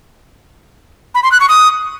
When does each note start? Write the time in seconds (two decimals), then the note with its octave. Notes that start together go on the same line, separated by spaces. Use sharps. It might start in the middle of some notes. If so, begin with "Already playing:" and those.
1.15 B5
1.23 C6
1.32 F#6
1.40 C#6
1.49 D#6